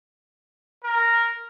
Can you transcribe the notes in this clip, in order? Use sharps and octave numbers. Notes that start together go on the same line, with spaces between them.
A#4